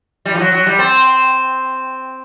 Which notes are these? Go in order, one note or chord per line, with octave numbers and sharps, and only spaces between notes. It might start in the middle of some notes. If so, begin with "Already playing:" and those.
G3
F3
F#3
F#3
G3
C4